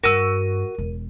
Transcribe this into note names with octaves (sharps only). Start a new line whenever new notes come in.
G2 F#4 A#4 E6 D#7
E1